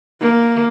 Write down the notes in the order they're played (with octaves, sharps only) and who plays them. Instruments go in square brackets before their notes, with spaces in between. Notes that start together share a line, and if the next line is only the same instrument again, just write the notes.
[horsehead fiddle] A#3